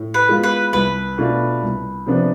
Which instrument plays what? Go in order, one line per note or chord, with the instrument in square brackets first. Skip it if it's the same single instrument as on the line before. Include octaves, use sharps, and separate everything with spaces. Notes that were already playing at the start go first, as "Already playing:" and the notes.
Already playing: [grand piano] A2
[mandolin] B4
[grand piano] G#3 B3 F4
[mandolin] B4
[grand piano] C2 [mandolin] B4
[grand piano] B2 A3 D4 F4
C2
C3 F3 B3 D4